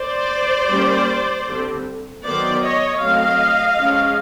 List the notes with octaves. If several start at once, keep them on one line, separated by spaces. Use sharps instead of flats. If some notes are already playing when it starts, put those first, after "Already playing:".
Already playing: C5 D5
G3 A#3 C#4
D3 G3 C4
D#3 F#3 B3 C5 D5
C#5 D#5
F#3 A3 C4 D#5 F5
F3 G#3 C#4